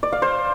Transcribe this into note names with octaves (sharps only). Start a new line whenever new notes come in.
D5
F5
C5